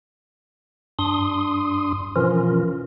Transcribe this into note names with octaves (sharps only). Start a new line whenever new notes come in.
G2 D4 C6 D#6
B2 E3 F3 C#4 F4 A#4